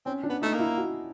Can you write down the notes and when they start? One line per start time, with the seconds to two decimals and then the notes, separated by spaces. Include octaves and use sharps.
0.06 C4 C#4
0.23 D4
0.30 B3
0.41 A3 D#4
0.54 A#3
0.59 E4
0.77 F#4